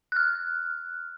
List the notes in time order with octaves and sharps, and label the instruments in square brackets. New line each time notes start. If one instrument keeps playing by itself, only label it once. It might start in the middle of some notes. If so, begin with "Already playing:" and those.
[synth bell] F6 F#6